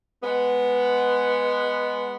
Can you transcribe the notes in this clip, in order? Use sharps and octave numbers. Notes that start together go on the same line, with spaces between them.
G#3 B3